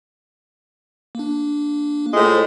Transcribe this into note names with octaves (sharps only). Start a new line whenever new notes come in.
A#3 D4
A2 G#3 F4 C5